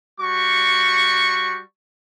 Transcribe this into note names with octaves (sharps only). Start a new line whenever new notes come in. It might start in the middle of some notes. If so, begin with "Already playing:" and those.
G3 F#4 C#6